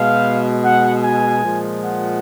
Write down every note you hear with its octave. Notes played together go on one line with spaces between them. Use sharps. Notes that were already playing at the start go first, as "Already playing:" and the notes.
Already playing: B2 G#3 F5
F#5
G#5
A#2 F3 G#3
F#5